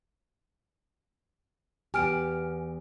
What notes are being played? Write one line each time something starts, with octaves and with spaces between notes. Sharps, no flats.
E2 B3 G4 G#5 F6 D7